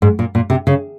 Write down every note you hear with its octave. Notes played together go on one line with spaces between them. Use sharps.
G#2
A#2
A#2
C3
C#3